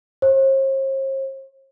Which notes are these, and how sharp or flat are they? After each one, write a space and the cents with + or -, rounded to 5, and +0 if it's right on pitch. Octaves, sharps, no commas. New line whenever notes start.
C5 +45